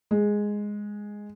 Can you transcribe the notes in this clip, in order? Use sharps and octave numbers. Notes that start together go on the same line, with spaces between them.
G#3